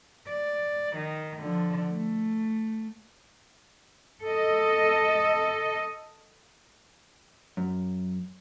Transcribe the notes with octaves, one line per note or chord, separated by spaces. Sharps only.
D5
D#3
D3 F3
A3
A4 D#5
F#2